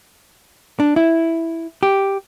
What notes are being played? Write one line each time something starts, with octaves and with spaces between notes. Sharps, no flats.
D4
E4
G4